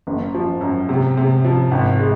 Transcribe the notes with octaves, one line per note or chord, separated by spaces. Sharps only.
F#1
F3
F#2
C3
C3
F3
G#1
G#3